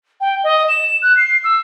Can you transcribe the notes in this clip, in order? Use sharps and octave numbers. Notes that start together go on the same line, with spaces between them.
G5
D#5
E7
F#6
C7
E6